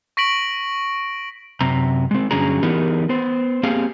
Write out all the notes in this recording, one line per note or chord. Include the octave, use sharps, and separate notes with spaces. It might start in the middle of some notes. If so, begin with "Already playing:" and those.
C#6 A#6 B6 D7 F#7
F#2 C3 A#5
G#3 C4
G2 D3 F#3 C#4 G#4 A#5
E3 B3 D#4 G4 G#4 A#4
B3 C5
A#3 C4 G4 G#4 F5